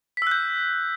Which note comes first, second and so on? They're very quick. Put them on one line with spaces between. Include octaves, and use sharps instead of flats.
B6 E6 F#6 G6